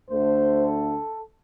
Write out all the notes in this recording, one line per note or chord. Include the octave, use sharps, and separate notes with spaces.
D2 D3 A3 C5
A4